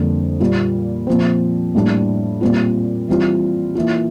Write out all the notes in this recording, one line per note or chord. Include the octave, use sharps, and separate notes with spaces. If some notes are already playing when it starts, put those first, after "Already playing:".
Already playing: F2 D3 G3 A#3
A#2 G3 A#3 F4
A#2 F3 C4
A2 G3 A#3 D4
A#2 G3 C4 F4
E3 G3 C4 F4
E3 A#3 F4